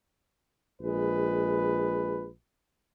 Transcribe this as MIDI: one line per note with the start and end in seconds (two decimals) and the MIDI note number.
0.82 2.29 34
0.82 2.29 56
0.82 2.29 71